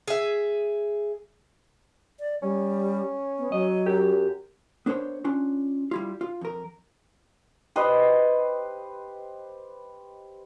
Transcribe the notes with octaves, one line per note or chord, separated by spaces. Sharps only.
G#4 E5
D5
G3 C#4
B3
F#3 D#5
F#2 G4
B3 D4 A#4 C5 C#5
C#4 D4 F4
G3 E4 F4
F4
F2 A#4
G4 B4 C5 D#5